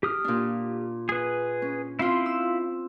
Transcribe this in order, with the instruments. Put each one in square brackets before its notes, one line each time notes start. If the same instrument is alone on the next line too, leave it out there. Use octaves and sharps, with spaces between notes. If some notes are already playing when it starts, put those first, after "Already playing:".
[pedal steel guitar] G4 D#6 F6
[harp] A#2 D4
[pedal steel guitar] G#4 B4
[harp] C#4
[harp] C4 F4 [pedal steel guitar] E4 F5 C6
[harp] E6